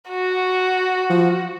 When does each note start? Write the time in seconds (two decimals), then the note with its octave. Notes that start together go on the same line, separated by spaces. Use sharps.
0.09 F#4
1.10 F3